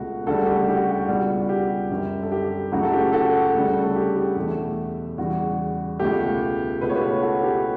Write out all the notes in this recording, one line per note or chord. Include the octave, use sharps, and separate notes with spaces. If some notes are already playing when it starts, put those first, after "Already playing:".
Already playing: C#2 B2 A3 F#4
D2 C#3 G3 F#4 A4
G4
G4
F#4
F#4
C#2 B2 G3
F#4
G4
F#2 D3 G3
A4
G4
C#2 C#3 F#3 A3 F#4
A4
G4
F#4 A4
D2 C#3 G3
A4
G4
G4
E2 B2 A3
E2 C#3 G3 F#4
C#2 B2 A3 G4
C#2 B2 A3 B4
C#5
G4 B4
F#4 A4
G4